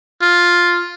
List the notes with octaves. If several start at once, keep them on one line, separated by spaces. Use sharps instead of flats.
F4